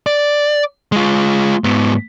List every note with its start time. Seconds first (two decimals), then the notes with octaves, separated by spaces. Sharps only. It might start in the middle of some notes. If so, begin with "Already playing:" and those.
0.07 D5
0.92 G#3 F4
1.64 G#2 B3